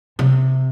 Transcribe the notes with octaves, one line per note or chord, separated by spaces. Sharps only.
C3